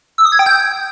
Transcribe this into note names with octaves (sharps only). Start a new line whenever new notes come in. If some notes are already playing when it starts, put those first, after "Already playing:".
E6
D#6
G#6
G5
G6